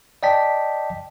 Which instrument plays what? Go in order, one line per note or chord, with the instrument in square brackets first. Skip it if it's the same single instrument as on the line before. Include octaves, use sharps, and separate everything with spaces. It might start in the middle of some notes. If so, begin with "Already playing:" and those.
[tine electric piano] D5 D#5 G5 A5 B6